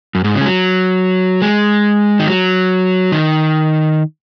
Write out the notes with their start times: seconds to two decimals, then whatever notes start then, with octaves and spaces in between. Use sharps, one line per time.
0.15 F#2
0.24 G#2
0.35 C#3
0.41 G#3
0.46 F#3
1.42 G#3
2.19 D#3
2.27 F#3
3.12 D#3